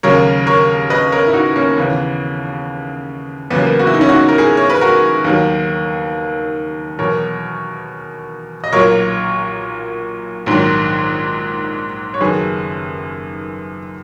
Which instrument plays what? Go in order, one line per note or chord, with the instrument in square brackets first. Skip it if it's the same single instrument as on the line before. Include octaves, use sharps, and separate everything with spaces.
[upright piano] D#2 C#3 F#3 A#4 C#5
A#4 C#5
B4 D#5
A#4 C#5
E4
D#4 F#4
A#3 C#4
D#2 C#3 E3 B3
E2 C#3 F#3 B3
A#3
B3
F#4
E4
D#4
C#4 E4
D#4 F#4
A#4
E4 G#4
C#5
B4
F#4 A#4
D#2 D#3 F#3
E2 B2 F#3 A#4 C#5
D#5
B1 A#2 F#3 A#4 C#5
A#1 G#2 D#3 F#3
C#5
F#1 F#2 D#3 F#3 G#4 B4